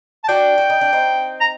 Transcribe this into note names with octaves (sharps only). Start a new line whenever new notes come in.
A5
D4 F#4 G5
F#4
D#4
D4
C4 D#4
A#5